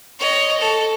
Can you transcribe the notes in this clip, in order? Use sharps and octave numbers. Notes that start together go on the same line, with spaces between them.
C#5 D#5
A4